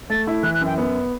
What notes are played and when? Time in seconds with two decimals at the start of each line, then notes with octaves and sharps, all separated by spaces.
0.10 A3 A6
0.27 E4
0.43 E3 F#6
0.54 F#6
0.61 F#2 G5
0.78 B3